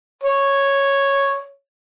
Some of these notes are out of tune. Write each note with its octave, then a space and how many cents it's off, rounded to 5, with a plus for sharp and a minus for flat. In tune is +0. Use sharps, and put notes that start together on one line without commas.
C#5 -5